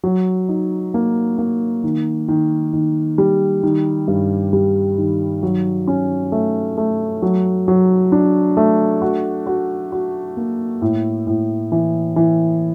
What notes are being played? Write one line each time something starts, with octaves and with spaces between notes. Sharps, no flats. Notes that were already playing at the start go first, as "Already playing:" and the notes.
F#3
D#4
A#3
A#3
D#3
D#3
D#3
G3
D#3
G2
G3
D#3
F#3
C#4
A3
A3
F#3
F#3
D4
A3
F#4
F#4
F#4
A#3
A2
A2
E3
E3